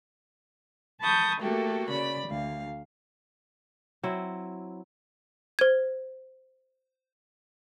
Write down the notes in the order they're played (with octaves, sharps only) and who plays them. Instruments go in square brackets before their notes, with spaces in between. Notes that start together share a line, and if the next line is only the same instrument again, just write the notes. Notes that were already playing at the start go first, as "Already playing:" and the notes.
[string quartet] A5 B5 C#6 D#6 G6
A3 A#3 F#4 G4 A4
C#3 D5 B5
D2 F5
[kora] F#3 C4 E4
[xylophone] C5 G#6